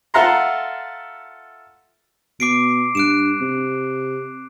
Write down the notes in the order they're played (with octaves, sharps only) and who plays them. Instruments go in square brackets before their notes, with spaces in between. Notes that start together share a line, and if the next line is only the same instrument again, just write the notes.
[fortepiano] F4 A4 E5 F#5 A#5 C6
[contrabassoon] B2 [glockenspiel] D6 C7 D7
[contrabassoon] G2 [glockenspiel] F#6 D7 E7
[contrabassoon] C3